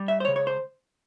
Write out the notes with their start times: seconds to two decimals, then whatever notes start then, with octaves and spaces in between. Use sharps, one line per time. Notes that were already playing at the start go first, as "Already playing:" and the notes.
Already playing: G3
0.08 E5
0.20 C5
0.25 C#2 C#3 C#5
0.36 C#5
0.47 C5